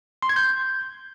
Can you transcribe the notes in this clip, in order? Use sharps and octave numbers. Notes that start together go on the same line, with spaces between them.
C6
G#6
G6